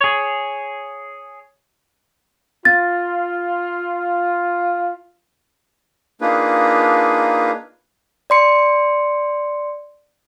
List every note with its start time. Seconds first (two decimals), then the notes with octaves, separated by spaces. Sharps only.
0.01 G#4 C#5
2.65 F4 A6
6.21 A#3 D4 D#4 F4 G#4 B4
8.30 D5 C6 C#7